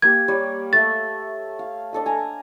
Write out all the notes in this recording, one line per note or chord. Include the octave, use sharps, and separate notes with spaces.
A#3 G4 G#6
G3 C#5
A3 E5 A6
F5
D4 A4 D#5
G#5 A#5